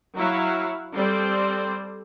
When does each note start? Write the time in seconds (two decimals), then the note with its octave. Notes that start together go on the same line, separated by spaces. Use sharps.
0.17 F#3 E4 C#5 F5 F#5
0.95 G3 C4 A4 C5 D5 C6